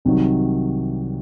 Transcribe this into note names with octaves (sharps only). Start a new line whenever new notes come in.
C2 C3 D#3 F#3